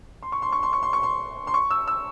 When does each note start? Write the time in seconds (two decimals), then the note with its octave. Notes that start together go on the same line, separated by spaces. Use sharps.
0.23 C6
0.32 C#6
0.42 C6
0.52 C#6
0.63 C6
0.73 C#6
0.83 C6
0.93 C#6
1.03 C6
1.47 C6
1.54 C#6
1.71 E6
1.87 E6